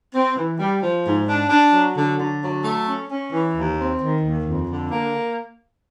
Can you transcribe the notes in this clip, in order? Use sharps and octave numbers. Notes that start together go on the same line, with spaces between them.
C4
E3
G3
F3
G#2
D4
D4
F#3
D3
D3
F#3
A3
C#4
C#4
E3
D#2
C4
D#3
D#2
F2
D3
A#3